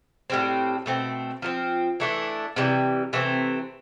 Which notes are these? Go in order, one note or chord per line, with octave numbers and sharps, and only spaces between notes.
A2 G3 C4
B2 A3 C4
F3 A3 C4
E3 A3 D4
C3 E3 G3
C3 E3 A3 C4